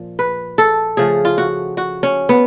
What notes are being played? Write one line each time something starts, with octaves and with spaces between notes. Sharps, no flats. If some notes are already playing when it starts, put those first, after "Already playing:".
Already playing: A#2 F3
B4
A4
C#3 F3 A3 G#4
F4
F#4
F#4
C#4
B3